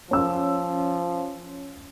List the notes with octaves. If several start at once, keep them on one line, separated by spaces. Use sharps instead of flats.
F3 C#4 E6